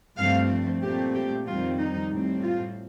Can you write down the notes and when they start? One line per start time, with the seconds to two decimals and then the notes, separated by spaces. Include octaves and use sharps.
0.17 G2 F3 A3 C4 F5
0.82 A#2 A3 C4 G4
1.14 G4
1.46 F2 D#3 G3 C4 F4
1.79 D#4
2.11 A2 G3 C4
2.43 F4